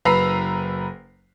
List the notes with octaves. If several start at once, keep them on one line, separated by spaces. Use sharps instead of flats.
F#1 B4 A#5 B5 E6 C7